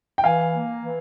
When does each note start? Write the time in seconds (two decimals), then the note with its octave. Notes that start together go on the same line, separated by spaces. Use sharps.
0.18 G5
0.24 E3 F5 G#5
0.54 A#3
0.82 E3